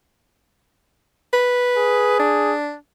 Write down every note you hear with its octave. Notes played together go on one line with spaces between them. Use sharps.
B4
G#4
D4